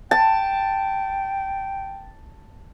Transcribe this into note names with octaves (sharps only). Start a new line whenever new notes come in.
G5 A5